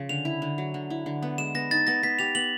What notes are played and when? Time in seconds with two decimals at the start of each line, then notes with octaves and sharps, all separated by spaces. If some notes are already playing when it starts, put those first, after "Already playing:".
Already playing: C#3 F3
0.09 D3 F7
0.25 E4
0.42 D3
0.58 F#3
0.74 D3
0.90 E4
1.06 D3
1.22 B3
1.38 G#3 E7
1.55 B3 A#6
1.71 D#4 A6
1.87 B3 A#6
2.03 B3 B6
2.19 G4 F7
2.35 B3 F#7